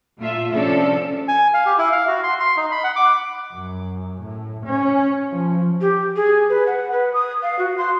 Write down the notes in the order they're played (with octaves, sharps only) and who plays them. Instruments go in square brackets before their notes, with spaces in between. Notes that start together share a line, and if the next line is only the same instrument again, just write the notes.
[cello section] A#2 A3 F4 E5
C3 F3 C#4 D4 A4
[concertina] G#5
F5
G4
E4
F5
F#4
C6
C6
D#4
B5
F#5
D6
[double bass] F#2
A2
C#4
F3
[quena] G4
G#4
B4
F#5
B4
D#6
F5
F#4
C6